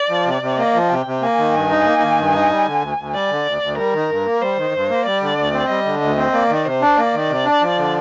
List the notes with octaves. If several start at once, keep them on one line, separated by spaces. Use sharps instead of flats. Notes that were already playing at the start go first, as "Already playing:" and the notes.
Already playing: D5
F3
C3
C3
A#3 D#5
F3
C3 G5
C3
A#3 G#5
D#3
G2 G#5
D#4
A#3
D#3
G2
D#4
G3
D3
D2
D2
G3 D5
D3
D2
D2
G3 A#4
D#3
G2
A#3
G3 C5
D#3
G2
A#3
G3 D5
D3
D2
C4
G3 D#5
D3
D2 D#5
C4
A#3 D5
D#3
C3 C5
D4
A#3 D5
D#3
C3
D4
F3
D3